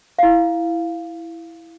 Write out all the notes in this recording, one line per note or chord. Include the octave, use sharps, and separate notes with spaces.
E4 F5